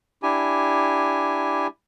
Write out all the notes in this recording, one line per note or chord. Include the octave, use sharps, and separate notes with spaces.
D4 E4 G4 G#5